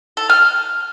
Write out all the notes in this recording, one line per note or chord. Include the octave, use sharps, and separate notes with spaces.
A4
F6